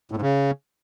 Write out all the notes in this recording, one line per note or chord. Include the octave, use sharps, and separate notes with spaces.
A2
G#2
C#3